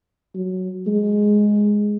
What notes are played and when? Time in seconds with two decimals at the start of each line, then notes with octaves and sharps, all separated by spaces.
0.35 F#3
0.87 G#3